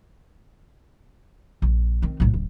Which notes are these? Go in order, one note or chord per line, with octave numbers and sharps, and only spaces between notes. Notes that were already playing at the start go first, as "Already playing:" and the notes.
A#1
D#3 C4
B1 A2
D1